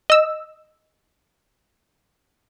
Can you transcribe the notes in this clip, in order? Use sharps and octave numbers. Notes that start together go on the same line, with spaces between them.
D#5 E6